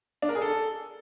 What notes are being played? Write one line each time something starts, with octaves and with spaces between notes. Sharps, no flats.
D4
A#4
G#4
A4